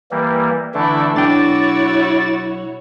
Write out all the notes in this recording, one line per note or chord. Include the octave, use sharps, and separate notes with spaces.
E3 G3 A#3
D3 E3 A3 D4 E4
B1 D4 E4 F#4 C#5 G5 D6 A6